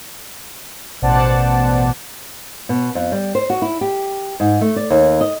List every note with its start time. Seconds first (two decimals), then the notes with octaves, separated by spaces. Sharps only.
1.02 A1 B2 C5 D5 F#5 A5
2.69 B2
2.95 F2
3.12 G3
3.35 C5
3.50 F#4
3.62 E4
3.81 G4
4.40 G#2
4.61 A3
4.76 D5
4.90 D#2
5.21 D#5